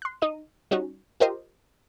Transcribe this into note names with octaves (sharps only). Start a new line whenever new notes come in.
C6 F#6
D#4 D#5 D#7
G3 C#4 D#4 F#4
F4 G4 A#4 C5 D#5